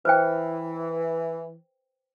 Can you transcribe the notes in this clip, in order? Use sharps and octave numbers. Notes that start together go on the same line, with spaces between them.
E3 B4 C5 G5